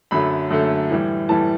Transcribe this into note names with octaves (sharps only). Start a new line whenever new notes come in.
F#2 D3 F#3 A3 B5
F#2 D3 F#3 A3
A2 E3 G3
A2 E3 G3 A5